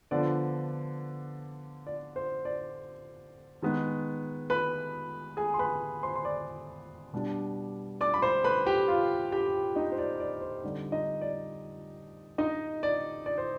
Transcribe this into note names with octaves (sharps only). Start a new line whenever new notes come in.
D3 F3 B3 D5
D5
C5
D5
D#3 G#3 B3 D#4
B4 B5
G#4 G#5
C6
B4 B5
C5 C6
C6
D5 D6
B2 G3 D4
D5 D6
B5
C5 C6
B4 B5
G4 G5
F4 F5
G4 G5
D#4 D#5
C5
D5
D5
C5
D3 G3 C4 D#4 D5
D#4 D#5
D5
D#4 D#5
D5
D5
C5